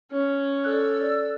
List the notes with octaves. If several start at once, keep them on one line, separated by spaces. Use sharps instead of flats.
C#4
A4 D5 E6 F#6